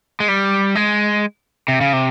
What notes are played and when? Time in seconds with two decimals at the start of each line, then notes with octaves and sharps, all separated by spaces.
0.20 G#3
0.28 G3
0.75 G#3
1.68 C3
1.81 C#3
1.93 C3